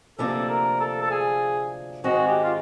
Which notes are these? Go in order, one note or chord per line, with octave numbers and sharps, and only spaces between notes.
D2 C3 F3 A#3 D4 A4
A#4
A4
A4
G#4
G#2 D#3 G#3 C4 D#4 F#4
G4
F4